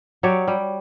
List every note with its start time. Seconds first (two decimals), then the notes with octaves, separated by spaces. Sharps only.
0.23 F#3 G4 C#5 D5
0.48 G3